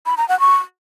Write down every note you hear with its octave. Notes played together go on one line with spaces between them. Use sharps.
B5
A#5
F#5
C#6